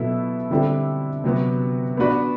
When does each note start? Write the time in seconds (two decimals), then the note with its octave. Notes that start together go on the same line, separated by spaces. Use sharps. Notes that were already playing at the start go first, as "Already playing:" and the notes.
Already playing: B2 F#3 B3 E4 A4
0.50 D3 G3 C4 E4 A4
1.24 C3 F#3 B3 F#4
1.97 B3 D4 F#4 B4 D5